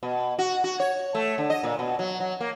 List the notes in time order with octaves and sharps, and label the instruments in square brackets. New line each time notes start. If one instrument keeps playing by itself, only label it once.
[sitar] B2
F#4
F#4
C#5
A3
D3
D#5
A#2
B2
F#3
F#3
A#3